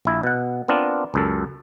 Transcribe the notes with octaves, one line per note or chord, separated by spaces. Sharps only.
A#1 E4
B2 F#5
B3 C4 D4 F4 A#4
C#2 F#2 A4